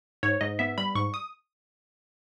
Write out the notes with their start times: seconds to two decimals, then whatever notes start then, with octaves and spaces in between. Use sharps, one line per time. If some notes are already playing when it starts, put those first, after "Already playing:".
0.23 G#2 C#5
0.41 G#2 D#5
0.59 B3 E5
0.78 G3 B5
0.95 G#2 C#6
1.14 D#6